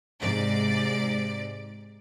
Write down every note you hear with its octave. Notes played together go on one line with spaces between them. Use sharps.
G#2 C3 D5